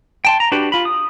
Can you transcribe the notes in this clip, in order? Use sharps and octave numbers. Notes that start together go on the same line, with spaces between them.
G5 A5 C6
A#5
D4 F#4 G4 B4
F4 B5
D#6